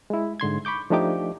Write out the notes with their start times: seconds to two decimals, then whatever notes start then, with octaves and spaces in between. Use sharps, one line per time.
0.10 G#3 E4
0.40 G#2 D3 C6 G#6
0.65 B5 C#6 D6 G6
0.90 F3 A3 D4 D#4 G4 D6